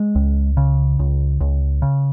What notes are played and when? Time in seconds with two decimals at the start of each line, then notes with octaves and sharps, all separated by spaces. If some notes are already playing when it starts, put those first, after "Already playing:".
Already playing: G#3
0.15 C#2
0.57 C#3
0.99 C#2
1.41 C#2
1.82 C#3